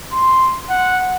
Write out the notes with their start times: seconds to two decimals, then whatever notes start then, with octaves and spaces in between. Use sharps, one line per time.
0.12 C6
0.70 F#5